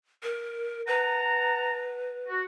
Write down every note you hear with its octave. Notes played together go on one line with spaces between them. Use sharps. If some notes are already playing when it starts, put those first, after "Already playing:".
A#4
B4 F#5 A5 A#5
F#4